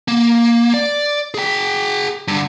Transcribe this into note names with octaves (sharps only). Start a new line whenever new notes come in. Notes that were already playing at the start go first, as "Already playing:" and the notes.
A#3
D5
G#4 G5
G2 D3